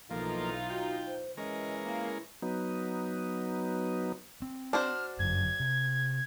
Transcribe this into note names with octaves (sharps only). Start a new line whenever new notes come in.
B1 E3 F3 A#3 D#4 F4 A4
F#4 G5
C5
E3 G#3 C#4 A#4 D#5
A#3 E4
F#3 B3 D#4
C4
D4 F#4 C5 F6
G1 F#2 G#6
C3